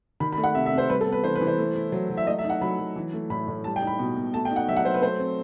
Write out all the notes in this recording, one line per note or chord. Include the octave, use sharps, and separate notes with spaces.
D#3 B5
B5
A3
F#5
C3 E5
E5
C3
C5
G3 B4
A4
B3
B4
E3 C5
B4
E3
C5
A3
E4
F#3
F#3
E5
A3 D#5
E5
D#4
F#5
F#3 B5
F#3
E3
A3
A2 B5
A2
G3 A5
G5
D#4
B5
B2
B2
A3 A5
G5
D#4
F#5
F#3 E5
F#5
F#3 C5
B4
A3 C5
C4